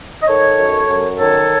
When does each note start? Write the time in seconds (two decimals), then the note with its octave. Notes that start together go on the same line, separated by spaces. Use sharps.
0.22 D#5
0.28 D#3 A4 C#5
0.58 F#2
0.88 F#2
1.17 D#3 A4 C#5